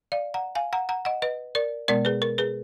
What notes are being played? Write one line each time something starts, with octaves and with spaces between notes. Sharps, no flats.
D5 F5
F#5 A#5
F5 G#5
F#5 A#5
F#5 A#5
D#5 F#5
B4 D#5
A#4 D5
B2 G#3 B3 A#4 D5
G#4 B4
A#4
G#4 B4